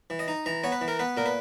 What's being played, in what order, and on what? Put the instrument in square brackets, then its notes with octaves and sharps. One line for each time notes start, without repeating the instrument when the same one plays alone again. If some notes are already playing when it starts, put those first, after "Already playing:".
[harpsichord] E3
D#5
D#4
E3 A#5
B3 C#5
B4
E3
A#4
B3 B4
A#2 A#4
B4